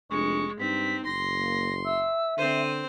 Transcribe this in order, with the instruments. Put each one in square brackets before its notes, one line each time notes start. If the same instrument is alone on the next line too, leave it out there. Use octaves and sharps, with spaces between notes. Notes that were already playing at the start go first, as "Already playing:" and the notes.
[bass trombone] F1 [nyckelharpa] G#3 [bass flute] D4 [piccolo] C#6
[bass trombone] G2 [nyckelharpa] C4 [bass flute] D#4 [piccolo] B6
[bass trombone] F#1 [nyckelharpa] C6 [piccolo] A#6
[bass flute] A#3
[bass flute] E5 [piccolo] E6
[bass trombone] D3 [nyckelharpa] C4 C5 [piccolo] D#7